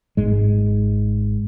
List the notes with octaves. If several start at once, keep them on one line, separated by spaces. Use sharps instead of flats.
G#1 G#2 G#3